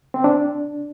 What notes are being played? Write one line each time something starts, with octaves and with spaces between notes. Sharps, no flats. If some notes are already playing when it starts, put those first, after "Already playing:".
C4
D4